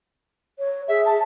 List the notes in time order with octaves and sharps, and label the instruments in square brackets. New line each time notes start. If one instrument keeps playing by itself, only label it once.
[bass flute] C#5
[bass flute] G#4 [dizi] E5
[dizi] A5